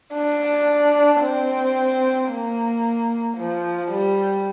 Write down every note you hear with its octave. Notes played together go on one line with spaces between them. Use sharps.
D4
C4
A#3
F3
G3